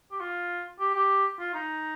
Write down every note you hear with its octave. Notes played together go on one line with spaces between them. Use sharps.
G4
F4
G4
G4
F4
D#4